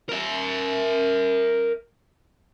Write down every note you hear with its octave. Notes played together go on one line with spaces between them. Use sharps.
A#4 E5